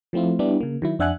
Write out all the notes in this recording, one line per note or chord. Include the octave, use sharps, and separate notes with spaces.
F3 A3 C4 E4 F4
G3 B3 D4 E4 G4
C#3 A#3
D#3 F#3 E4
F2 D4 E5 F#5 G#5 F#6